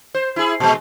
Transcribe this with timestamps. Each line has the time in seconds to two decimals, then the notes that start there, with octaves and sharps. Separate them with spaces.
0.15 C5
0.36 E4 G#4
0.60 A#2 G#3